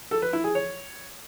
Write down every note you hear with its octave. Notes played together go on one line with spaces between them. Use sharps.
A4
B4
E4
G#4
C#5